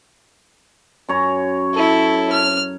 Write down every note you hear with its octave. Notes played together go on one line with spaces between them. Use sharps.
F#2 C#5 A#5
E4 A4
F6